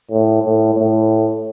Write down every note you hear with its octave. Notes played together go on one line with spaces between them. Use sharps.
A2
A2
A2